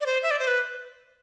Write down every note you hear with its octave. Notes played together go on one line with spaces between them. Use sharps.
D5
C5
E5
D5
C5
B4